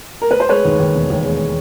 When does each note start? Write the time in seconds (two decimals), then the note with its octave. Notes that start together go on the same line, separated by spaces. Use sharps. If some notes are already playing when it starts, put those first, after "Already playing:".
0.22 A#4
0.31 B4
0.40 C5
0.49 G#3 B4 C#5
0.65 D#2
0.80 D#2
0.95 E1
1.10 D#2
1.24 G#3